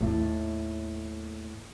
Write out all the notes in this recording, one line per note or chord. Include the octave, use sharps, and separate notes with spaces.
D#2 A2